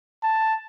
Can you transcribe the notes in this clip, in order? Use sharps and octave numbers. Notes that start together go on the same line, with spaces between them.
A5